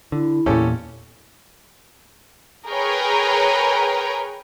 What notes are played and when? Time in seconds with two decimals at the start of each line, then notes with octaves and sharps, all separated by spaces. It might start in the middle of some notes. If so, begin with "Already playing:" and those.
0.12 D3 E4
0.46 E2 A#2 C#4 G4 A4
2.67 G#4 A#4 B4 C#5 G5